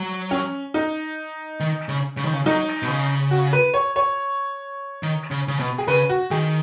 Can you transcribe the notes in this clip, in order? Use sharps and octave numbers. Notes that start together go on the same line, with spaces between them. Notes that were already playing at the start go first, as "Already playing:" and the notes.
Already playing: F#3
C#4
D#4
D#3
C#3
C#3
D#3
C#3
F#3 D#4
B2
C#3
F#4
B4
C#5
C#5
D#3
C#3
C#3
B2
G#4
C#3 B4
F#4
D#3 G#4